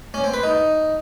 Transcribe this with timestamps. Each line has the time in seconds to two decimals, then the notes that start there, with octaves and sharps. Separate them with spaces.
0.14 C#4
0.24 C4
0.34 B4
0.43 D#4